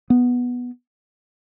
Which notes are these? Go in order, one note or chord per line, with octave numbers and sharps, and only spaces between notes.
B3